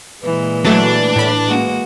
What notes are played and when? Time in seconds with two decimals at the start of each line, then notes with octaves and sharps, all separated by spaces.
0.23 A#2 E3 G#3 B4
0.65 F#3 A3 D4
1.16 A2 B5
1.46 G#3 A#3 F#4